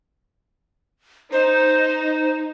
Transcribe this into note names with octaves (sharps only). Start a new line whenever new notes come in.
D#4 C5